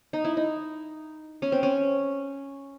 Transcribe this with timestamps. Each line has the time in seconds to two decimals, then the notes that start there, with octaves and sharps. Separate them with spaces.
0.13 D#4
0.25 E4
0.37 D#4
1.42 C#4
1.52 C4
1.63 C#4